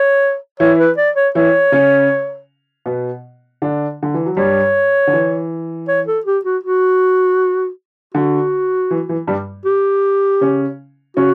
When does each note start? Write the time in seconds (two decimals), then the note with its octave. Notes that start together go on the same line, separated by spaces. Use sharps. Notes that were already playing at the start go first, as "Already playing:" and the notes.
Already playing: C#5
0.60 E3 E4 C#5
0.78 B4
0.97 D5
1.16 C#5
1.35 E3 E4 C#5
1.72 C#3 C#4
2.86 B2 B3
3.62 D3 D4
4.03 D3
4.14 E3
4.26 F#3
4.37 G2 G3 C#5
5.07 D3
5.13 E3
5.88 C#5
6.07 A4
6.26 G4
6.45 F#4
6.63 F#4
8.14 D3 F#4
8.91 E3
9.09 E3
9.27 G2 G3
9.66 G4
10.41 C#3 C#4
11.17 C#3 C#4 F#4